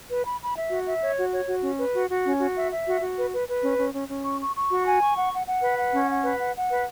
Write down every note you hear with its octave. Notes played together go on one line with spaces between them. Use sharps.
B4
B5
B5
E5
F#4
E5
C#5
F#4
C#5
F#4
C#4
B4
F#4
F#4
C#4
F#4
E5
E5
F#4
F#4
B4
B4
B4
C#4
C#4
C#4
C#4
C#6
C#6
C#6
F#4
G#5
C#6
F#5
F#5
F#5
B4
F#5
C#4
F#5
B4
F#5
F#5
B4